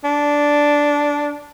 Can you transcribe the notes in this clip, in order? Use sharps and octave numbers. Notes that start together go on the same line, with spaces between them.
D4